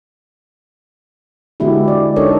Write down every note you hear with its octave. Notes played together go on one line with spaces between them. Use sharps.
D3 G#3 B3 E4 F#4 G4
F#4 D5
D4 D#4 A4 A#4 C#5 D#5